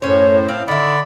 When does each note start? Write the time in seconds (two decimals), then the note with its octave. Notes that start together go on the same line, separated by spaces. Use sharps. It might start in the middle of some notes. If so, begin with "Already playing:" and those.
0.02 F#2 A2 C#4 C5 C#5
0.49 C4 F5
0.68 D3 D#3 E4 D5 B5